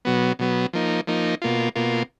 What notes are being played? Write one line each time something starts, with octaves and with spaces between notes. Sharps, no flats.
B2 F#3 B3
B2 F#3 B3
F3 A#3 D#4
F3 A#3 D#4
B2 A#3 F4
B2 A#3 F4